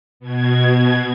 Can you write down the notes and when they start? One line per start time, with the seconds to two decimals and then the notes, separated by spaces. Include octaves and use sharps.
0.20 B2 G#6